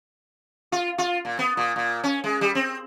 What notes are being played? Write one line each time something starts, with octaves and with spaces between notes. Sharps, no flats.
F4
F4
A#2
B3
A#2
A#2
C#4
G#3
G3
C4